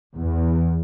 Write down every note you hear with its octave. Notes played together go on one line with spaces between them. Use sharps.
E2